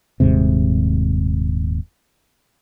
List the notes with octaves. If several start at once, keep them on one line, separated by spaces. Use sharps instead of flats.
D#1 D#2 G#2 C3